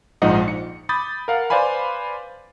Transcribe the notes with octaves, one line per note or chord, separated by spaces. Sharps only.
A#1 G#2 F3 D#4 D#5 F#5
C#7
B5 D6 D#6 G6 A6
A#4 F5 F#5
B4 C5 D5 F5 G#5 B5